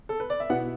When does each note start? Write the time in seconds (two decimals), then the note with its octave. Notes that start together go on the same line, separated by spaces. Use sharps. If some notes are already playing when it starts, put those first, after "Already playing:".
0.09 A4
0.20 B4
0.30 D5
0.40 E5
0.50 B2 B3 E4 F#5